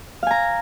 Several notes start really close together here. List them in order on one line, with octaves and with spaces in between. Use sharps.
F5 G#5 A#5